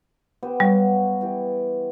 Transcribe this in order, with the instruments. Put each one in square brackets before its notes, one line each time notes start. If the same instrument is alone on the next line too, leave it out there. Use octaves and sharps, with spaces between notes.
[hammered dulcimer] B3 G4 C5
[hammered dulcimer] F#3 F#4 F5 [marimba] G3
[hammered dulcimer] E3 G4